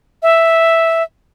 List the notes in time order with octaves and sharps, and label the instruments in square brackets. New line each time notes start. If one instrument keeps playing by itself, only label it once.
[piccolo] E5